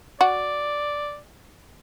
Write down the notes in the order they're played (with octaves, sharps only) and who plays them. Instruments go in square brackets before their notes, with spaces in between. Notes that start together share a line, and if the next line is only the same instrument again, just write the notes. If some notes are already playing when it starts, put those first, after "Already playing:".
[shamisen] F#4 [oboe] D5